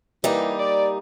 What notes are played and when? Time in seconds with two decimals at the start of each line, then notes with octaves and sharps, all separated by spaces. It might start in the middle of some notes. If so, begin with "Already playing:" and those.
0.24 E3 G3 A#3 D#4
0.59 D5